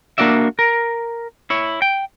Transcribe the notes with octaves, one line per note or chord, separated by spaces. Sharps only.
A#3 D4 F#4 D5 E5
A#4
E4 C#5
G5